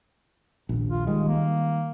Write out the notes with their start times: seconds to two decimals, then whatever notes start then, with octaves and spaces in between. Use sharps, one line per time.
0.69 A#1 D#2
0.90 F4
1.07 D#3 G3 G#3
1.28 A#3